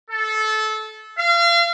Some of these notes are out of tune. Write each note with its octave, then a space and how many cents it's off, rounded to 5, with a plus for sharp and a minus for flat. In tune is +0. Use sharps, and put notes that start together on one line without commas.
A4 -20
F5 -35